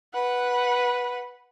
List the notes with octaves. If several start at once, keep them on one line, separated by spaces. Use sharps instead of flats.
B4 F#5